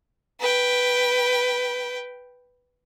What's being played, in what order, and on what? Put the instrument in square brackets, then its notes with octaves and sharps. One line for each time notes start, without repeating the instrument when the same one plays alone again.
[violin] B4 G5